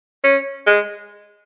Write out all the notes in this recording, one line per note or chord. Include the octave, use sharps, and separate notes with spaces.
C#4
G#3